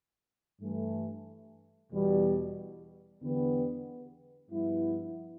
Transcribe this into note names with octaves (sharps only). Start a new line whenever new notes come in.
G2 E3 A3
E2 B2 G3
E2 D3 G3 B3
G2 F3 B3 E4